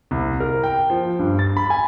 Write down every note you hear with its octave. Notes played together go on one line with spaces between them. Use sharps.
C2
A#4
G5
F3
G2
A6
B5
G#5